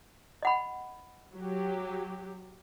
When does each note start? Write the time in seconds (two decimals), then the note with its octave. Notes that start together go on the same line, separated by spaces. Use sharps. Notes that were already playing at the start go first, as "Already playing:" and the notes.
0.43 D#5 F#5 B5
1.35 F#3 G4